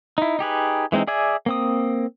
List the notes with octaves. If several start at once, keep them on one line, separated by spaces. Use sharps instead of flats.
D#4 E4
D#4 G4 G#4 B4
E3 G#3 C4 D#4
G#4 D5 E5 G#5
A#3 C4 D#6